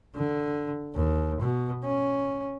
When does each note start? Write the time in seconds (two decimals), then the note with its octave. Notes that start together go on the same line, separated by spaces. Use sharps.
0.15 D3
0.94 D#2
1.41 B2
1.84 C#4